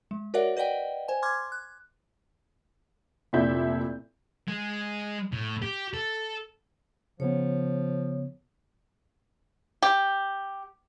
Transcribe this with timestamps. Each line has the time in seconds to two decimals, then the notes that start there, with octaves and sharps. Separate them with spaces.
0.11 G#3
0.34 F#4 A#4 C#5 D5 E5 F#5
0.57 B4 D5 D#5 F#5 G5
1.08 C5 G#5
1.22 C6 D6 F6 G#6
1.52 F#6
3.33 F1 A#2 D4 E4 E5 G6
4.48 G#3
5.33 A2
5.62 G4
5.94 A4
7.20 C#3 F3 B3 C#5
9.82 G4